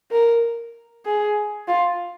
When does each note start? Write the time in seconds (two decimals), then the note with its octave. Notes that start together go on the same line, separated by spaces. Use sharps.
0.11 A#4
1.06 G#4
1.68 F4